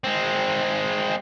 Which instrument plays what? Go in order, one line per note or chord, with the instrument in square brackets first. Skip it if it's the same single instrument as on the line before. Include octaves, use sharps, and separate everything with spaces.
[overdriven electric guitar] G#3 C4